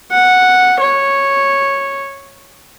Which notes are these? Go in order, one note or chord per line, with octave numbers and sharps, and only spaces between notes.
F#5
C#5